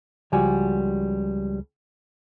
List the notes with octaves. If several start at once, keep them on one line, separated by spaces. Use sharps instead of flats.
C#2 F3 G3 F#4 G#5